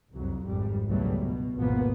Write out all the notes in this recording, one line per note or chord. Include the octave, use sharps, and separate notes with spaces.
C2 F2 F#3
G#1 F2 G3
C#2 G2 B2 F#3 G3 A3
B2
G#1 D#2 B2 F3 A#3 B3